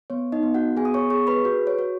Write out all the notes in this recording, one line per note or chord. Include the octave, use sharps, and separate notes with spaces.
B3 C#5
D#4 D#5
B3
F#4 F#5
B3 G#4 G#5
D#6
C#5 C#6
G#4 C#5 C#6
B4 B5
F#4 B4
C#5
F#4